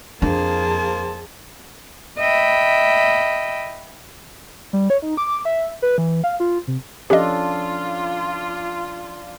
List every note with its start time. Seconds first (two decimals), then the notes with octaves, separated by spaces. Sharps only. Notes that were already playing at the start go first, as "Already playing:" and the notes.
0.22 F2 A#3 D4 G#4 C5 A5
2.17 D#5 E5 G5 B5
4.73 G3
4.90 C#5
5.02 D#4
5.17 D6
5.45 E5
5.82 B4
5.98 E3
6.24 F5
6.40 F4
6.68 C3
7.10 F3 C#4 D4 F4 G4 A4 D#5